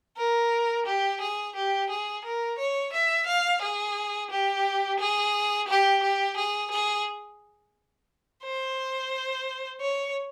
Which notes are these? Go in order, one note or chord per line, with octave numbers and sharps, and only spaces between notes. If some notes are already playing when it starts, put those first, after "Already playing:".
A#4
G4
G#4
G4
G#4
A#4
C#5
E5
F5
G#4
G4
G#4
G4
G4
G#4
G#4
C5
C#5